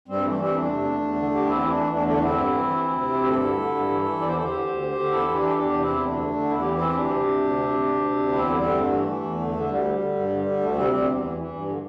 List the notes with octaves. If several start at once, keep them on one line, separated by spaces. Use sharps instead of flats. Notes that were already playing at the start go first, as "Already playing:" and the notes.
G2 G3 C4
E3 A3
E3 G3 C4
E2 A3 D4
C3
E2
E2
D3
D3 G4
E2 C4 E4
E3
A3 D4
E3
E2 A3 D4
D3 A3 D4
D3 C4 E4
G2
E3
E3
D2
C3
D2
G4
G2 E4 A4
D3
D3
G2
E3
E3
E2 D5
C5
D3 A4
G4 C5
D3
D2
D3
D3
E2 E4 A4
E3
D4 G4
E3 A4
E2 D4 G4
C3
C4 E4
E2
D2 A3 D4
D3
D3
E2 E4
E3 G4
C4 E4
E3
D2 D4 G4
C3
D2
D2
C3
D2
D2
C3
D2
E2 C4 E4
D3 A3
G3 C4
D3
G2 A3
E3
E3
E2
D3
D3
A3
D2 G3
D3
D3
G2
D3
D3
D2 A3
C3 G3 C4
D2 G3 C4
E2
E3
E3
G2
D3